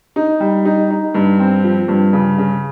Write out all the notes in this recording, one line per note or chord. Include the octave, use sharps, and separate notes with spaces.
D#4
G3
D#4
D#4
G2
C4
F3
G2
C#3
C#3